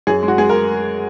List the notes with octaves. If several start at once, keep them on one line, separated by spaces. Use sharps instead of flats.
F#2 G#4
G#3
F#4
G#3 G#4
A#4